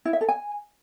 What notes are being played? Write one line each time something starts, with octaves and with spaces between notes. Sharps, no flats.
E4
E5
A4
G#5